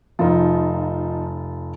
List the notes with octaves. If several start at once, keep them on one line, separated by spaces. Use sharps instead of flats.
F1 F3 D#4 F4